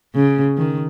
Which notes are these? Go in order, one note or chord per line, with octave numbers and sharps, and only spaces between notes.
C#3
D#3